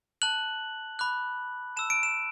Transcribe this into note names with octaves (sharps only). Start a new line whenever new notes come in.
A5 F#6 F#7
B5 D6 F#6
A5 E6 E7
D7
E7